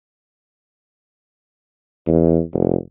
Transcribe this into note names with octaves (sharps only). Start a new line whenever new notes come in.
E2
F1